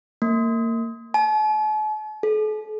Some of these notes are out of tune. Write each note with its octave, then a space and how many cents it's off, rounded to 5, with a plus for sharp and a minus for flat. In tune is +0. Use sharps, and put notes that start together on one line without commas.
A#3 -30
A5 -45
A4 -45